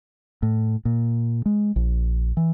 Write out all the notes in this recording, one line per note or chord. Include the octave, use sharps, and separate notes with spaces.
A2
A#2
G#3
A#1
E3